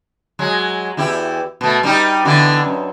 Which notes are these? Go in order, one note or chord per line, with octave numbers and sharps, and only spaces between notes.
F#3 G#3
E2 E4 G4
B2 A3
G3 D#4 G4
D3 E3 B3
F#2